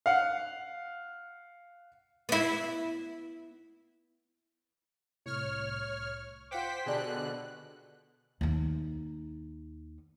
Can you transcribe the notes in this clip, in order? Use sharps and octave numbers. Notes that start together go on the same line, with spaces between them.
F5 F#5
B3 E4
C2 A2 C#5 F6
F4 C5 F#5 G5 D6 B6
B2 D3 D4 G4 G#4 F#6
D#2 D#4